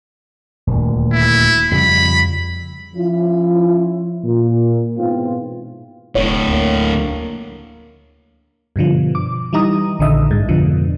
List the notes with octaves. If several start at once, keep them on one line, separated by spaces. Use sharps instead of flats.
D#1 D2
E4
F2 C#3 G3 B5
F3 C#4 E4 F4
A#2
G#2 B2 E3 C4 F4
F1 A2 D3 C#5
D2 A#3
G2 B2 D3 F3
D6
E3 G3 D#4 A#5 D#6
A#1 D3 D#3 D#5 E5
G#2
F2 B2 D3 F3